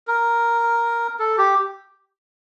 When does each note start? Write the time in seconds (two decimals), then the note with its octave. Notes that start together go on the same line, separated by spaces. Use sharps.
0.08 A#4
1.19 A4
1.38 G4